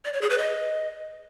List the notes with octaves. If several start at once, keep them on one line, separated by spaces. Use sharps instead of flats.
D5
C#5
G#4
B4
D#5